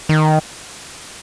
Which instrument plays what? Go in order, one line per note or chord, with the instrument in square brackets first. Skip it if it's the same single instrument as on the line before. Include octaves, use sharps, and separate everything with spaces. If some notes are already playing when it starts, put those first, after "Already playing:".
[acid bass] D#3